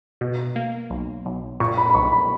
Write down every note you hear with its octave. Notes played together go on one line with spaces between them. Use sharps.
B2
A#3
B1
B1
A#2 C#6
B5
B5
B1 C#6
B5